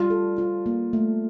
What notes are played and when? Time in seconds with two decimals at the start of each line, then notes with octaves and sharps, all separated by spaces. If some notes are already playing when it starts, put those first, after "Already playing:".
Already playing: G3 F4
0.10 A4
0.38 F4
0.66 A#3
0.93 A3